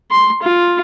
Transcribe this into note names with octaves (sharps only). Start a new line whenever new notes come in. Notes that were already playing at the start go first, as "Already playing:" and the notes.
C6
F4